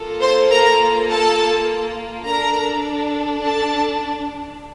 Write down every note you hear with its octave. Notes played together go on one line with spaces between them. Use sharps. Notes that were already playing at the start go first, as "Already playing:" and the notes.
Already playing: A#3 F4 A4
C5 C6
A#4 A#5
A4 A5
D4 A4 A#4 A#5
A4 A5